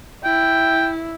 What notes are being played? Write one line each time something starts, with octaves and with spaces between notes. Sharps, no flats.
E4 G5